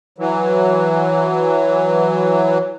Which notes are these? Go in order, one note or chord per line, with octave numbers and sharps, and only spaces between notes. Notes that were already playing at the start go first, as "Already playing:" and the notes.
E3 F#3